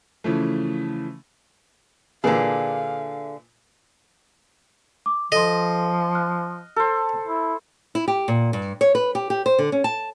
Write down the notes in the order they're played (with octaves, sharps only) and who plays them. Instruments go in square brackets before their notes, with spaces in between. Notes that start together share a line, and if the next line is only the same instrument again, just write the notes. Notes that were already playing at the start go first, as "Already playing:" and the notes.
[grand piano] C#3 E3 F3 A3
[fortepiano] A#2 E3 [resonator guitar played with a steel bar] D3 G#4 [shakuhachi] F5
[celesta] D6
[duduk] F3 [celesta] A4 C6 [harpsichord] D#5
[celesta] F6 F#6
[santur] A4 C5
[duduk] E4
[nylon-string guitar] E4
G4
A#2
G2
C#5
B4
G4
G4
C5
D3
C#4
A5